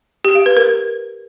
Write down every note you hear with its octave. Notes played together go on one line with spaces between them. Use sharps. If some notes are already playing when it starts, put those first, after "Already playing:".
G4
F5
B4
A#4